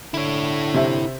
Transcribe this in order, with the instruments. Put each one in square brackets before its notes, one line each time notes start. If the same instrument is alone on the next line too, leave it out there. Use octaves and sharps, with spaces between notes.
[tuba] D3 [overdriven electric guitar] E4 C#5
[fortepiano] C3 E5